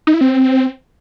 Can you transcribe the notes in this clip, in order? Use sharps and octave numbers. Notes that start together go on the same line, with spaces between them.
D#4
E4
C4